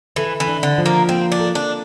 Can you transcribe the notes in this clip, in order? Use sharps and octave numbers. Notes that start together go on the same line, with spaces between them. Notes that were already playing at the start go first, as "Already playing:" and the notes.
E3 A4
E3
D4
D3
F3
A#3
A#3 C4
D4
A4
D4